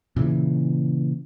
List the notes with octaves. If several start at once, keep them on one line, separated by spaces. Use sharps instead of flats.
A#2 C#3 E3